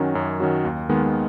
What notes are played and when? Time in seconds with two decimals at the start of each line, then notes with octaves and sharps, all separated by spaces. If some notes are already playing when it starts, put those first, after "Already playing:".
Already playing: F#2 D#3 F#3 C#4 F#4
0.15 F#2
0.40 D#3 F#3 C#4 F#4
0.65 D#2
0.89 D#3 G#3 B3